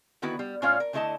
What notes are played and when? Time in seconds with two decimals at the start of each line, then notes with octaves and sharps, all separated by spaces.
0.22 D3 D#3 B3 E4 F#4 B4
0.39 G3
0.62 A2 C#4 F4 C#5 D5 F5
0.80 A#4
0.93 D3 A3 E4 A#4 D#5 A5